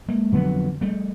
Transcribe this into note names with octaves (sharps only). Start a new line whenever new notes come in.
G#3 A#3
F2 D3 F#3 B3
G3 A3